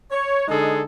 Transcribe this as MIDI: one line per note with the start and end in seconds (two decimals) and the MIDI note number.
0.11 0.44 73
0.47 0.81 50
0.47 0.81 56
0.47 0.81 63
0.47 0.81 68
0.47 0.81 69